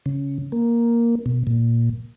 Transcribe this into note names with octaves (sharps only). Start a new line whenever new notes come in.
C#3
A#3
B2
A#2